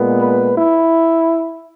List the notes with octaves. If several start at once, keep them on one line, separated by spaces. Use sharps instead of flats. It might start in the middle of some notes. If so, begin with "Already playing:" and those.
Already playing: A#2 G#3 B3
B4
E4